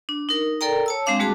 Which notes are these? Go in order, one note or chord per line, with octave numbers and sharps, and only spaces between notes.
D4
D#4 A#4
A4 A#4 D5 G5 A#5
C#5 A5 E6
G#3 C4 D4 F5 D6
G3 A3 F#4 G#4 A5 D6